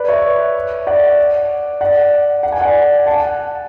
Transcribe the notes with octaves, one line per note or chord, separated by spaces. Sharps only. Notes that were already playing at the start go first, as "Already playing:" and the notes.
Already playing: B4 D5
C#5 E5
D5 F#5
D5 F#5
F#5
G#5
D5 F#5
F#5 A5